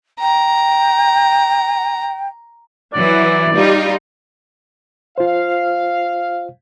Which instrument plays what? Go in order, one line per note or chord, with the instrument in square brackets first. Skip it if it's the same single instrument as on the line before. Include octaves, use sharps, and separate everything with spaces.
[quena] G5 [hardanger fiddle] A#5
[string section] E3 F#3 [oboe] D5
[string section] G3 D#4 F4
[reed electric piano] F4 C5 [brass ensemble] F5